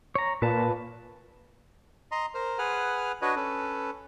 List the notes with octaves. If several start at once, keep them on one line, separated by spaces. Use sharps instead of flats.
C#5 A#5
A#2 B4 A5
D#5 A#5 C6
A#4 C5
G#4 B4 F#5 F6
D4 F#4 B4 C#5 D#5
C#4 A4 B4